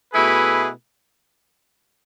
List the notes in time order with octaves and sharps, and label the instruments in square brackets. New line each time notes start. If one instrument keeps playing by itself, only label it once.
[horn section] B2 A3 E4 G#4 B4